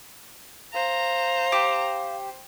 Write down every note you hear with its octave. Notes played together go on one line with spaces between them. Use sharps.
C5 F5 A#5
G4